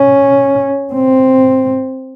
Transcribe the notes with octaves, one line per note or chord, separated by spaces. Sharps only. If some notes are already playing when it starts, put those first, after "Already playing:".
Already playing: C#4
C4